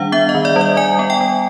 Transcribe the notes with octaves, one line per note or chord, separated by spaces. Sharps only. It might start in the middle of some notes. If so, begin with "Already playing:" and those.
Already playing: D#3 G3 D4 F5 F#5
B3 E5
D#5
D#3
D5
G3
D5
G3 G#5
B3
G5
G3